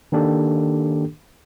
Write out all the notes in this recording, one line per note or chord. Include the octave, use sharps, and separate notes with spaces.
D#3 A#3 D4 G4 A4